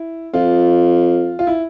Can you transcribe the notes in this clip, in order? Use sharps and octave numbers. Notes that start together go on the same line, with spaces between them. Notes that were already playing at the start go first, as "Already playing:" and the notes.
Already playing: E4
F2 F4
F4
E4